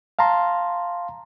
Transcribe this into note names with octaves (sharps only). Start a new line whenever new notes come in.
F5 A5 A#5 C6